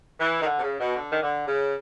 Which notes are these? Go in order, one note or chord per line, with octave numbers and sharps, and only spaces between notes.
E3
D#3
D3
C3
C#3
B2
D3
D#3
D3
C#3